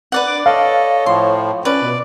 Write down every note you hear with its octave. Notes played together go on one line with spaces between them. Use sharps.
B4 D5 F#5
D4 D6
A4 C#5 D#5 F5
A2 F3 C6
C#4 B4 D5
B2